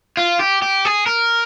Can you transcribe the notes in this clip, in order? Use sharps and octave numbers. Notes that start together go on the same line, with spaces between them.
F4
G4
G4
G#4
A#4